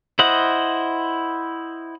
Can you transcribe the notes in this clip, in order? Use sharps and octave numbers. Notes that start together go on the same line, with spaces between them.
E4 C5 D#5 F#5